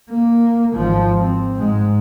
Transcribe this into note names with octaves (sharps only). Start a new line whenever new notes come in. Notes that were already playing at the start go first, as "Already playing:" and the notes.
A#3
G#1 F3
C4
G#2 G#3